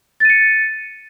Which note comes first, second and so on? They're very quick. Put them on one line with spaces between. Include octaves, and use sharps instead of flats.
A6 D#7 C#7